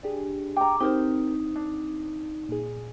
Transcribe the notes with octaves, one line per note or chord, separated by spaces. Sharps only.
D4 G4 G#4
G5 A#5 D6
C4 D#4 G4 A#4 C5
D4
A#2 G#4